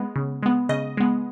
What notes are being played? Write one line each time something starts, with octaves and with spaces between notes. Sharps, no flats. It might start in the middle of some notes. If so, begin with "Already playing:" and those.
Already playing: G#3 B3
C#3
G#3 B3
C#3 D#5
G#3 B3